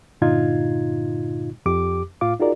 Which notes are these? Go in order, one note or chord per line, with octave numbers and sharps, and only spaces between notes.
G2 A#2 D3 D#4 F4 G#6
F2 G4 D6
A2 F4 F5 D6
D#4 F4 F#4 G#4 A#4 D5